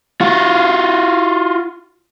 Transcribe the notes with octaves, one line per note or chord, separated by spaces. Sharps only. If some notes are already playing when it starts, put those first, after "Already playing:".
F4 F#4